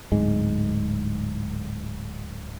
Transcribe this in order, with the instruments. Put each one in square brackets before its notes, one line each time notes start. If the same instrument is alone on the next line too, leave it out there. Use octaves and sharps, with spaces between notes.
[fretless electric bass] D1 G#2 G#3